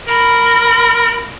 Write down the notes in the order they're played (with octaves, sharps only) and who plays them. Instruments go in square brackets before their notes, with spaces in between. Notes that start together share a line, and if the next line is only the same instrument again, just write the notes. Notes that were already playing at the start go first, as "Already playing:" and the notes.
[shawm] A#4 [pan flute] B5